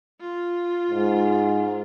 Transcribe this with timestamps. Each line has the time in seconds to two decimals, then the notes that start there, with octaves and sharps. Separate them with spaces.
0.21 F4
0.91 G#2